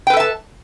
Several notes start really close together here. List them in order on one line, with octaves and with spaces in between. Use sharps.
G5 B4 A4 E5 A5